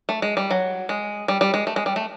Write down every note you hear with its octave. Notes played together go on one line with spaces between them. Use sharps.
A3
G#3
G3
F#3
G#3
G3
G3
G#3
A3
G#3
G3
A3